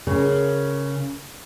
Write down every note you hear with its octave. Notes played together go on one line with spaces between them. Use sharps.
C#3 A#4